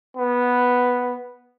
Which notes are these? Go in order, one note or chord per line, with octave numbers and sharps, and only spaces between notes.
B3